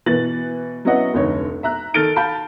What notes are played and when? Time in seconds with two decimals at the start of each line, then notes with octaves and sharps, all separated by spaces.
0.06 B2 E3 B4 A6 F#7
0.85 F#3 B3 C#4 E4 D#5 F#5
1.14 F1 D2 D#4 C#5
1.63 E5 A#5 F#6
1.94 D#3 A4 F6 A6 D7 G7
2.16 F5 A5 B5 G6